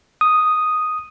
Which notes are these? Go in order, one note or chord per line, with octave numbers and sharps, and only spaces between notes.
D#6